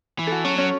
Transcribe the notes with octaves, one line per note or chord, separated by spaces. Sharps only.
E3
F#4 A4
F#3 C#4
C#4